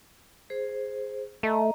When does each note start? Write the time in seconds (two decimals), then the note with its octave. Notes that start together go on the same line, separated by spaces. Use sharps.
0.50 G#4 C5
1.43 A3 D#5 A#5